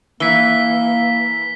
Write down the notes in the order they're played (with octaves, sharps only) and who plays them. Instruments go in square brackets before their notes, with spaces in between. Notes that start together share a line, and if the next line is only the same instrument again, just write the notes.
[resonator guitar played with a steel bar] E3 [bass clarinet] A#3 [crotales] B6 G7